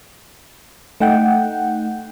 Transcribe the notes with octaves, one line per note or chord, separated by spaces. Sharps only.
A3 D#4 F#5 G5